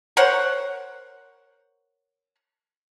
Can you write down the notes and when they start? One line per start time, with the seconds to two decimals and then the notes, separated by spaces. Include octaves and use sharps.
0.17 A#4 C5 C#5 F#5